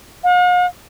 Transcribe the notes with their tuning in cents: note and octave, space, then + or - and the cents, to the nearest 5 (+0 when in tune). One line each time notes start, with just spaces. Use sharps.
F5 +45